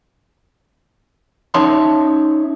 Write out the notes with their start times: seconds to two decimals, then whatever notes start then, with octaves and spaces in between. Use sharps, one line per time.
1.54 C#4 D#4 C#5 E5 A5 C6